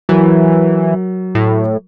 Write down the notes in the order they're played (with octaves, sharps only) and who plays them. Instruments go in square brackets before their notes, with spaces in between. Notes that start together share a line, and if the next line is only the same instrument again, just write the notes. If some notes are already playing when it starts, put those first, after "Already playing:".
[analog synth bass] E3 [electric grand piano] F#3 A#4
[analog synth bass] A2